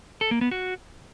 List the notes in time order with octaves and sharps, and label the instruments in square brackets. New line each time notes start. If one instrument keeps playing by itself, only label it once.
[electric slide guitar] A4
A#3
B3
F#4